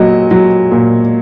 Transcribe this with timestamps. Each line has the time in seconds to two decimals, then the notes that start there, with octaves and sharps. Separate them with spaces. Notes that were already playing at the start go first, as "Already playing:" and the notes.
Already playing: A#2 F#3 D#5
0.31 F#3
0.72 A#2